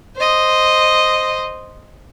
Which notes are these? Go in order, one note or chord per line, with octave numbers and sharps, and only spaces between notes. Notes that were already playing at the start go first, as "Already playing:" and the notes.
C5 D#5